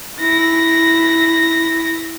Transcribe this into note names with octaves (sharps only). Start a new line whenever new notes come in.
E4 A#6